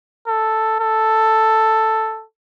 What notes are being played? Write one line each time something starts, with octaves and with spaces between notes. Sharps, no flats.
A4
A4